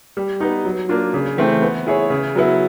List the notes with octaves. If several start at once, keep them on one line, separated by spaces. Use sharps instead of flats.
G3
B3 D#4
F#3
A#3 D4 F4
C#3
E3 A3 C4
B3
E4 G#4 C#5
C#3
F#3 B3 E4